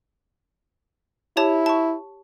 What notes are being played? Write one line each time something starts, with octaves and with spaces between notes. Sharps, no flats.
E4 G4 C#5 A5
A5 C#6